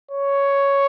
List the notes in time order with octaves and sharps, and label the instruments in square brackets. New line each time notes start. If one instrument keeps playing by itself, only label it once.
[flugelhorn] C#5